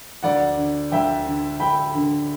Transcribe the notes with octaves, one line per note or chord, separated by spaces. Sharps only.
D2 D5 F#5
D3
D2 E5 G5
D3
D2 G5 B5
D3